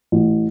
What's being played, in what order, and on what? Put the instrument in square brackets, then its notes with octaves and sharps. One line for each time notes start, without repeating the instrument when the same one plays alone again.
[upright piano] A1